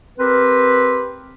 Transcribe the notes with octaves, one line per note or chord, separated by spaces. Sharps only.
C4 G4 A#4 B4